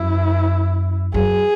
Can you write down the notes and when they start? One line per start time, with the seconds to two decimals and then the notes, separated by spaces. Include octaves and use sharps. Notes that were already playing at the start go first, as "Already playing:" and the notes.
Already playing: F#2 E4
1.14 F#2 G#4